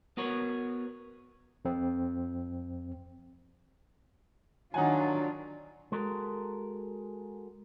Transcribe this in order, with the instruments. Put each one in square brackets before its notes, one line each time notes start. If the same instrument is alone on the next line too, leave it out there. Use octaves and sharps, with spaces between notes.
[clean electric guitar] B3 F#4 A#4 C#5
[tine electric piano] F2 C4
[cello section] D#3 D4 F4 [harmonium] F#3 [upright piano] D#4 F#5 G#5
[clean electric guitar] G#3 F#4 A4 A#4